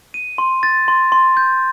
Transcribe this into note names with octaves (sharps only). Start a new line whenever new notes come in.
D#7
C6
A6
C6
C6
G6